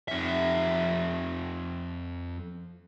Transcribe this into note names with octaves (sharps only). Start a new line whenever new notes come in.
F2 E5